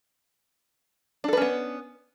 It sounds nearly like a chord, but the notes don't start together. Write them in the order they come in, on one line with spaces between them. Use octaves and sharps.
D4 A4 B4 C#4 B3